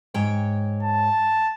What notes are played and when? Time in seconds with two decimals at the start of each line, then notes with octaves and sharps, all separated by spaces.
0.14 G#2 C#5 G5
0.83 A5